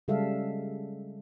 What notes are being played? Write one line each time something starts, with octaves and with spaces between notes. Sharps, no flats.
C#3 G3 G#3 A4 E5 F5